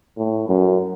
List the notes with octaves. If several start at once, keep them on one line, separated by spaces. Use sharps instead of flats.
A2
F#2